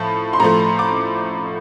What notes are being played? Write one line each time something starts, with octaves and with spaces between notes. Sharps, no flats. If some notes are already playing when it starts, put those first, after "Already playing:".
Already playing: A2 F3 A3 A5
C6
A2 F3 A3 A#5
D6